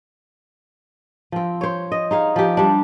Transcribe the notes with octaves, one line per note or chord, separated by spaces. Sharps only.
F3 C4
C5 C#5
D#5
D#4 G#4 F5
F3 G4
G3 D4